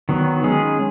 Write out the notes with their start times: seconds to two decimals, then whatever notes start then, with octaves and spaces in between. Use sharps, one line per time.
0.09 D#3 F#3 B3
0.43 D#3 G#3 C#4 G#4